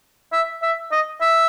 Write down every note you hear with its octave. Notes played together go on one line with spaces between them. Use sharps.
E5
E5
D#5
E5